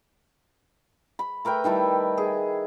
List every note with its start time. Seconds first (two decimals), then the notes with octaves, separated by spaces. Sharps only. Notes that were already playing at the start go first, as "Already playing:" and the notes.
1.19 B5
1.45 A3 A#4 B4 G5
1.64 D#3 G3 E4 A5
2.18 G#4